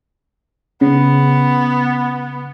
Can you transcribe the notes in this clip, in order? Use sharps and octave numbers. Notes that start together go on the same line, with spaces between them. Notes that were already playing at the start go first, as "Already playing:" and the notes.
C#3 B3